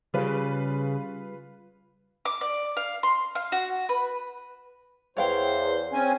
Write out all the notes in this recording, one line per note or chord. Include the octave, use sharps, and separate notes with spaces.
C#3 G3 F4 B4
D6
D5
F5
C6
F5
F#4
B4
E2 C5 C#5 F5 G5
C4 C#4 G#5